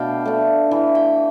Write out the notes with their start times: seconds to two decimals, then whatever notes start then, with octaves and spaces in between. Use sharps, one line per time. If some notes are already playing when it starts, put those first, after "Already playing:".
Already playing: B2 A3 D4 F5 G5 B5
0.25 A3 D4
0.71 E3
0.95 G5